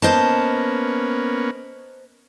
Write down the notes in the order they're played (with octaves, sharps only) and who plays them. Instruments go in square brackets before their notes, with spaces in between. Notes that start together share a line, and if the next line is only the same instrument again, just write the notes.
[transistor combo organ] A#3 B3 C#4 [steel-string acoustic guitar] C5 D#5 A5